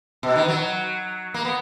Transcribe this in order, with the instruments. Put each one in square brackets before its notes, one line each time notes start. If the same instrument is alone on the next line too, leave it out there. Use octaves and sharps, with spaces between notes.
[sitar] B2
D#3
F#3
A#3
B3